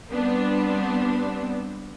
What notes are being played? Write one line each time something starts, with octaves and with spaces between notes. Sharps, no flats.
G3 B3 C4 D4